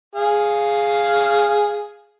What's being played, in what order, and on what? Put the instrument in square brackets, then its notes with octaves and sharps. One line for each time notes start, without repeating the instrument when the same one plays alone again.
[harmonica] G#4 F5